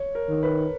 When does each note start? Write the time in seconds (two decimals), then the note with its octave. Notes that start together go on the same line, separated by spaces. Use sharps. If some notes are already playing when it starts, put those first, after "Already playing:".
Already playing: C#5
0.15 A#4
0.29 D#3
0.43 B4